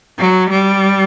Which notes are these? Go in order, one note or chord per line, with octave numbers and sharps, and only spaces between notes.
F#3
G3